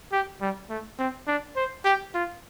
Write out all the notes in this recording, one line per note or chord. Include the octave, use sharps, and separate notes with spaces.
G4
G3
A3
C4
D4
C5
G4
F4